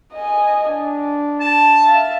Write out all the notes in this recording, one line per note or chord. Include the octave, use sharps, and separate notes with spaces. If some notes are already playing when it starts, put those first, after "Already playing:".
D#5 G#5
D4
A5
E5 F5